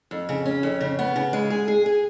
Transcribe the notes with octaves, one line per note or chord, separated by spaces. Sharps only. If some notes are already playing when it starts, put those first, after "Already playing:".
F2
C#3
C#4
F2
C#3
B3
C#3
G#3
G#4
G#4
G#4